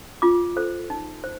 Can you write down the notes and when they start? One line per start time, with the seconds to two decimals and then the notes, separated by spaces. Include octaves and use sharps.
0.22 F4 D6
0.56 A4 C5
0.90 D#4
1.24 C5